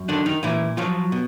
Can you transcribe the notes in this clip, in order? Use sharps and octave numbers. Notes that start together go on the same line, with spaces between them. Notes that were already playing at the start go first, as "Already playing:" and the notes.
Already playing: F#2
D3 D#3 D4
D#3 D#4
A#2 E3 E4
F3 F#3 F4
B2